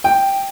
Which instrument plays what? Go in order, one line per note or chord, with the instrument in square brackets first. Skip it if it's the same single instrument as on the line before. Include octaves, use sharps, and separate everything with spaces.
[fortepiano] G5